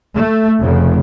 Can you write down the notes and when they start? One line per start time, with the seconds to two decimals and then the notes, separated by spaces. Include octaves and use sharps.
0.13 A3
0.61 F1 C#3